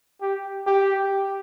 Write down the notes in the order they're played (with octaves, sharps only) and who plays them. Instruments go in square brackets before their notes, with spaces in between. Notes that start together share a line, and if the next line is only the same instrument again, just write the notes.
[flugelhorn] G4
G4